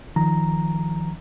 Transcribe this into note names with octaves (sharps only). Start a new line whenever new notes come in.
D#3 F3 A#5